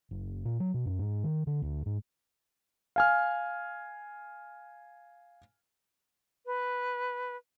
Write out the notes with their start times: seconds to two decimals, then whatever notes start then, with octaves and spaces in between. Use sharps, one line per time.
0.11 F#1
0.45 A#2
0.60 F#3
0.74 B2
0.86 F#2
0.99 G#2
1.24 D#3
1.47 D3
1.62 D2
1.86 G#2
2.96 F5 G#5 F6
6.46 B4